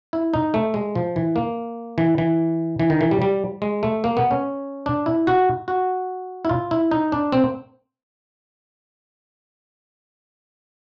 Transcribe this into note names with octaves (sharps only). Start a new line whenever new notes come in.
E4
D#4
A3
G#3
F3
E3
A#3
E3
E3
E3
D#3
E3
G3
G3
G#3
A3
A#3
B3
C#4
D4
E4
F#4
F#4
E4
F4
E4
D#4
D4
C4